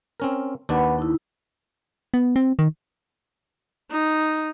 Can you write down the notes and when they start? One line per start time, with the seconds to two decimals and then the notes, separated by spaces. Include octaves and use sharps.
0.20 C4 C#4 A#4
0.69 D#2 D4 B4 D5 F#5 B5
0.99 D#4 E4
2.14 B3
2.36 C4
2.59 D#3
3.91 D#4